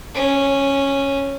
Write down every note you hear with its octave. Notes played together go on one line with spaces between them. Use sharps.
C#4